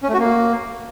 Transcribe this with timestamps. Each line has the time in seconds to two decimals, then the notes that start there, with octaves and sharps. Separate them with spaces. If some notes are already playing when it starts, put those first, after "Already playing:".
0.03 C#4
0.08 A3
0.14 F#4
0.19 A#3